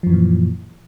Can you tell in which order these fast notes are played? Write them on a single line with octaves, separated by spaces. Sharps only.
F3 F#2 E3 A#2